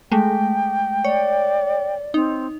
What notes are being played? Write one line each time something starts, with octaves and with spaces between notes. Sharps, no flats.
G#3 A3 G5
C#5 D5
C4 D#4